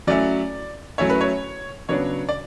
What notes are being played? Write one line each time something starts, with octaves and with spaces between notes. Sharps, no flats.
F#3 A3 C#4 E4 D5
F#3 A3 C#4 E4 C#5
B4
C#5
C#3 F#3 B3 D4 C#5
D5